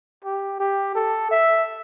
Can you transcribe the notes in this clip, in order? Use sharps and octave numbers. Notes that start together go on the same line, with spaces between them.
G4
G4
A4
E5